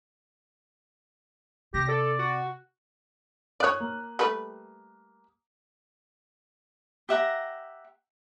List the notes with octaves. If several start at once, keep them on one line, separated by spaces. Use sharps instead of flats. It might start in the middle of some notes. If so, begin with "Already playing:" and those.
C3 G4 A#6
A4 D5
F#4
C#5 D5 F5 D#6 F#6
A#3
G3 A3 B4
G4 E5 F#5 A#5